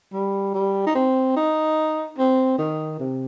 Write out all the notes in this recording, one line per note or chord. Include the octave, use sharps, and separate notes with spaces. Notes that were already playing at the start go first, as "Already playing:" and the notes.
G3
G3
D#4
C4
D#4
C4
D#3
C3